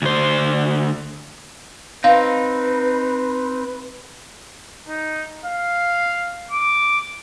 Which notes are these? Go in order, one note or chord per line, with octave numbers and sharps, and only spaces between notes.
D2 C5
C4 D#4 B4 F5
D#4
F5
D6